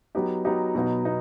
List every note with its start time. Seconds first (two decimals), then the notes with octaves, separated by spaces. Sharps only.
0.15 F#3 B3 D#4 G4
0.45 F#3 B3 D#4 G4
0.75 B2 F#3 B3 D#4
1.05 B3 D#4